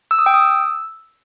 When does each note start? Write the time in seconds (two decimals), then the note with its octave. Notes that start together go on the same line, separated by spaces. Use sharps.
0.11 E6
0.19 D#6
0.26 G5
0.34 D#6
0.42 E6